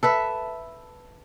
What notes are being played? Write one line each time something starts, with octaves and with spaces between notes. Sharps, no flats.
A4 B4 E5